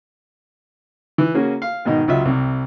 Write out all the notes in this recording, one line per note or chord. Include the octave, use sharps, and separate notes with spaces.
E3
C#3 A#3 C#4 F#4 G#4
F5
G#2 B2 D#3 D#4
C#2 F#3 F4 D#5 E5
C2 C3